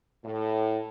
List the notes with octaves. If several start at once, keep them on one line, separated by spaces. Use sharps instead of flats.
A2